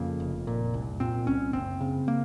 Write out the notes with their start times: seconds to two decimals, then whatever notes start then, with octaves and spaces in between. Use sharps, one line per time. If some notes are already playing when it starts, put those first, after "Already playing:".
Already playing: F2 C#3 A#3
0.20 F1
0.47 A#2
0.74 C2
1.00 A#2 C4
1.27 C2 C#4
1.53 F#1 C4
1.81 C#3
2.08 A#3